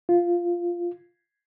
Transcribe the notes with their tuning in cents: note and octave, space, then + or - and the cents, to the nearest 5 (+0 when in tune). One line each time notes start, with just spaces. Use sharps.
F4 -5